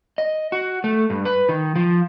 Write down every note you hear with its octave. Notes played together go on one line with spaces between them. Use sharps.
D#5
F#4
A3
G2
B4
D#3
F3